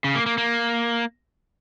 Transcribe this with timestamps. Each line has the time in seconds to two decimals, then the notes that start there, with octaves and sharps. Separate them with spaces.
0.04 C#3
0.15 A#3
0.26 A#3
0.38 A#3